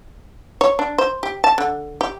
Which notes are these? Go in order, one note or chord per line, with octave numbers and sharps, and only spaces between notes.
C#5
D4
C5
G4
A5
D3
G4